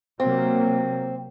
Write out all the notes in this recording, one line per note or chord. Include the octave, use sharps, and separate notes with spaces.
C3 F#3 A#3 C4